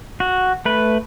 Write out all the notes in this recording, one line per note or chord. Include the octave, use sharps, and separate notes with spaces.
F#4
A3 B4